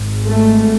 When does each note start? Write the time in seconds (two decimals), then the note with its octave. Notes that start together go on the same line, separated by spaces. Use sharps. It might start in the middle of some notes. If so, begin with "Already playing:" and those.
Already playing: G#1 G#2
0.25 A3